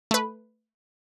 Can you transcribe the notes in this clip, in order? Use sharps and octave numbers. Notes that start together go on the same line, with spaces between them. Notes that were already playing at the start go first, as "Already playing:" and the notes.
A3 B4